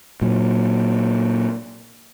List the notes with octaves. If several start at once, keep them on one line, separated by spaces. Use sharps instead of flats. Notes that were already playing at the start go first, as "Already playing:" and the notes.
A#2 F#3